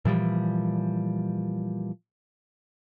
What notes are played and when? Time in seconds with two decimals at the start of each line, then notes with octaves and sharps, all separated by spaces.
0.05 A#2 E3 F3 G3